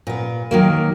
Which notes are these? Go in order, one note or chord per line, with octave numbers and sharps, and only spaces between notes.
A#2 B3
D#3 F#3 A#3